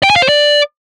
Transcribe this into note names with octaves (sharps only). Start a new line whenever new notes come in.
G5
G#5
F5
C5
D5